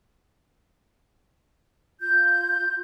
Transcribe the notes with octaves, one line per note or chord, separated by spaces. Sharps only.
F4 G6